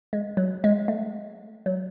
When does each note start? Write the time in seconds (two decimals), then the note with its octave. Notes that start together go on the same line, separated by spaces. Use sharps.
0.13 G#3
0.37 F#3
0.64 G#3
0.88 A3
1.66 F#3